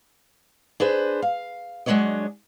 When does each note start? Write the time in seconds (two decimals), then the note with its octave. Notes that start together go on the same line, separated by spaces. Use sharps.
0.80 D4 G#4 B4 C5
1.22 F5
1.86 F#3 G#3 B3 D4 C#5 D#5